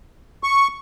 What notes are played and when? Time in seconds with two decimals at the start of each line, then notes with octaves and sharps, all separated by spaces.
0.43 C#6